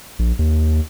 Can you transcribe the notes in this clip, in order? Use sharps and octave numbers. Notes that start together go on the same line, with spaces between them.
A#1
D#2